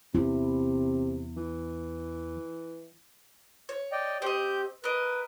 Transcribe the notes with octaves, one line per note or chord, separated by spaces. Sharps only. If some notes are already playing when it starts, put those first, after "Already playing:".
E2 C3 E4
E3
C#5
D5 D#5 G5
C4 G4 D#5 G6
A#4 B4 D#5